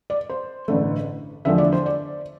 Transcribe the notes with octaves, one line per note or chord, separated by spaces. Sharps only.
D5
C5
A1 G2 D3 A3
E2 D3 F3 A3 E5
D5
C5
D5